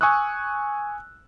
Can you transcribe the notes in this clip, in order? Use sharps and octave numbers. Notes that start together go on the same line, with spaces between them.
G#5 C#6 D#6 E6 F#6